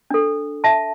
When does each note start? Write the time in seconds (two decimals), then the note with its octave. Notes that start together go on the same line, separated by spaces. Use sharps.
0.10 D4 A4
0.64 E5 A5